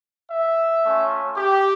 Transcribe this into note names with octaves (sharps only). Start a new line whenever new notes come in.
E5
A3 C#4 F4
G4